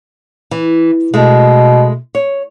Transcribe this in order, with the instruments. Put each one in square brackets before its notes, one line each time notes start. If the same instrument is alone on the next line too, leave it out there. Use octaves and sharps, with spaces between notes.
[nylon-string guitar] E3
[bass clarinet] B2 [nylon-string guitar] G#3 A3
[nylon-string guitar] C#5